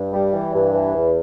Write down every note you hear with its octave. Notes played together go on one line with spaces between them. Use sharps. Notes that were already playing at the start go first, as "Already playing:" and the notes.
Already playing: G2
G3
E3
G2
E3
E2